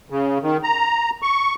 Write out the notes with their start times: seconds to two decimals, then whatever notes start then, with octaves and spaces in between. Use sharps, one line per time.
0.10 C#3
0.43 D#3
0.63 A#5
1.22 C#6